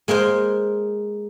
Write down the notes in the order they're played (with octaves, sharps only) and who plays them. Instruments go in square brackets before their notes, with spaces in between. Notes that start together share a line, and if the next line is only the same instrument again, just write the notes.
[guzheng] G#3 A#3 A#4 C5